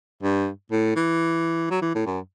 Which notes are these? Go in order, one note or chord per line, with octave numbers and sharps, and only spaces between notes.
G2
A2
E3
F#3
E3
A2
F#2